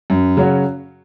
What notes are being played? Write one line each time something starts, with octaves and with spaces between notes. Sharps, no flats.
F#2
C#3 F#3 C#4 F#4